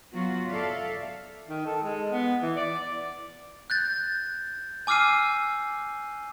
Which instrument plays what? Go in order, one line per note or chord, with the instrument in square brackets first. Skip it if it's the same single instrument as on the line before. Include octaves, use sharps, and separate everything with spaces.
[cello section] F#3 B3 F4 F#4
A4 D5 E5 F5
[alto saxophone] D#3
A4
G#3
B3
E3
D5
[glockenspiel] F#6 G6 A6
G#5 D6 E6 F6 C7 D#7